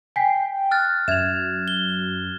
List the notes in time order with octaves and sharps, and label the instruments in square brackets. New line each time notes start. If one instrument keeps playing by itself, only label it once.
[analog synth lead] G5 [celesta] G#5 B6 C7
[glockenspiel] F6 F#6 A6
[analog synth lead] F#2 [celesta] E5 F7 [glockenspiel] G#6 E7
[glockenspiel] G7